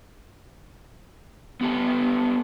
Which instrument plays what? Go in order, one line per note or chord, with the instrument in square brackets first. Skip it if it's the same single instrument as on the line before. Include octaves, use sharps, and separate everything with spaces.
[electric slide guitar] B3 G4 A4